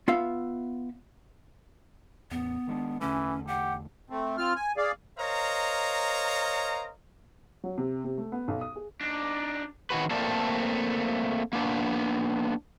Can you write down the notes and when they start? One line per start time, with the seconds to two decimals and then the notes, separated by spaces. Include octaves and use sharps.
0.08 B3 F4 E5 F5
2.31 A1 E2 B3
2.67 D#3 G#3 D4
3.01 E2 D3 E3 A3 C#4
3.48 G4 F#5
4.10 A3 C4
4.37 C4 F4 F6
4.55 G#5
4.77 G#4 D5 F5
5.18 A#4 C5 C#5 D#5 F5 A#5
7.64 F#3
7.78 C3
8.04 C3
8.18 A3
8.32 B3
8.48 B1
8.61 D#6
8.76 G#4
9.01 D4 D#4
9.90 D#3 F#3 F#4 B4
10.11 A3 A#3 C4 A4 A#4 D5
11.53 A#3 B3 D4